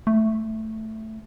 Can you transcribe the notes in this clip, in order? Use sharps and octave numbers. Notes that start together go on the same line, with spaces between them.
A3